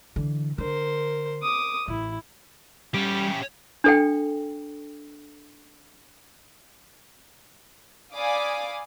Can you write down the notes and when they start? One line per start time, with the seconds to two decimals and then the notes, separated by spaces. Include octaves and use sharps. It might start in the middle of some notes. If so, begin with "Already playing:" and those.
0.16 D3 E3
0.58 D3 A#4 C5
1.43 D6 D#6
1.88 A1 E4
2.94 G3 C#4 G4
3.84 D4 A4 G5
8.13 D5 F5 G#5 B5 D6 D#6